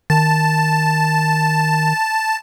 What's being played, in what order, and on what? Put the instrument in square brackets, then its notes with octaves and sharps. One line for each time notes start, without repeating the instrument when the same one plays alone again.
[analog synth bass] D#3 [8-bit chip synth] A5